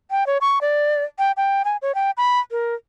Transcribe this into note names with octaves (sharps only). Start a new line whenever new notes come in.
G5
C#5
C#6
D5
G5
G5
G#5
C#5
G5
B5
A#4